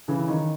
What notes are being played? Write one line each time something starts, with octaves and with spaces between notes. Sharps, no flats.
C#3 E3
D#3